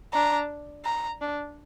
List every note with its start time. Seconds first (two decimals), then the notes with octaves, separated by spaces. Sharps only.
0.14 D4 A#5
0.85 A#5
1.21 D4